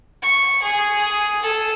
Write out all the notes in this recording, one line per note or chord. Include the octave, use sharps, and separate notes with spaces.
C#6
G#4
G#4
A4